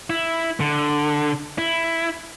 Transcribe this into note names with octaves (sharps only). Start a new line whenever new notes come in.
E4
D3
E4